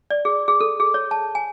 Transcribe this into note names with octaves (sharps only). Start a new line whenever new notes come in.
D5
G#4
G#4
A4
G#4
C#5
A5
G#5